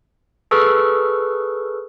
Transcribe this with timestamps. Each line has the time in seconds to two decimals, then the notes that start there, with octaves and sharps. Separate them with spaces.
0.51 G#4 A4 B4 C#6 E6 F6